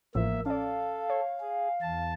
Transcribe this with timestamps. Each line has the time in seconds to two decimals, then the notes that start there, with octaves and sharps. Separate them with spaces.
0.15 A1 A2 F3 A#3 E5
0.46 C#4 A4 D5 F5
1.10 C#5
1.40 G#4
1.82 E2 A5